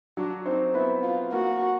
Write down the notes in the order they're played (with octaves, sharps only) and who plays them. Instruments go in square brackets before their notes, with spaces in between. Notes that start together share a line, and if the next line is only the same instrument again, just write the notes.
[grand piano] F#3 F#4 [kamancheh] D4
[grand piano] C4 C5 [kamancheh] D#4
[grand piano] B3 B4 [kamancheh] E4
[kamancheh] F4
[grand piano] A#3 A#4 [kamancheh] F#4